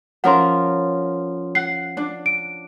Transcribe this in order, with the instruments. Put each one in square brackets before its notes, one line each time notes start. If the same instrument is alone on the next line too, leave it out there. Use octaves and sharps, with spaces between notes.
[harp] F3 C#4 A#4 [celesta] F#5 C6
[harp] F#5 [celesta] C7
[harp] D4
[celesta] D7